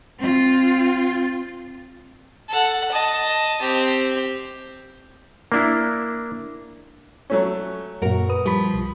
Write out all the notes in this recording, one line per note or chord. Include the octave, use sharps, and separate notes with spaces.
C4 F4
A4 F#5
D#5 A5
C4 G4
A#3 D4 E4
F#3 A3 C#4
F#2 A#2 F#4 A#4
B4 D#6
F3 G3 B5
B1